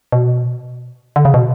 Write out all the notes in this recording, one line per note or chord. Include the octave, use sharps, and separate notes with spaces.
B2
D3
C#3
B2